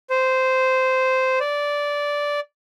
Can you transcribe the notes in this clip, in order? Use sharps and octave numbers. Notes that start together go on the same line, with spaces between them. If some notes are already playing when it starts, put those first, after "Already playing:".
C5
D5